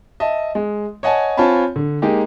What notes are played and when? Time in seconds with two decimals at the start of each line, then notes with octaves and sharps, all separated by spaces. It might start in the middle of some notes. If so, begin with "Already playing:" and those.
0.20 D#5 E5 A5
0.55 G#3
1.03 C#5 D#5 F#5 G#5 A5
1.37 C4 F4 C#5 G#5 A5 B5
1.76 D3
2.02 G#3 A#3 D#4 G4